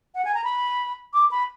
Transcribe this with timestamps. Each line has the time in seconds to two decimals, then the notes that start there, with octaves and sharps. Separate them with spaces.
0.15 F#5
0.25 G#5
0.35 A#5
0.44 B5
1.13 D6
1.31 B5